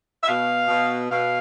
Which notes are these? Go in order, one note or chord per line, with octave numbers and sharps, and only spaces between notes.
E5
B2 F5
B2
B2 F5